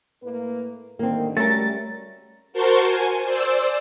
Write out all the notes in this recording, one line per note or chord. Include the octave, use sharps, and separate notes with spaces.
A2 A#3 B4
G2 D3 D#3 A#3 C4
G3 A3 C#4 F#4 A#4 A6
F#4 A#4 C5 A5 C6 C#6
G#5
C5 D5 E6